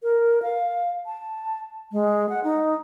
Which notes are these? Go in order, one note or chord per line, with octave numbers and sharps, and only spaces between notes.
A#4
F5
A5
G#3
F#5
D#4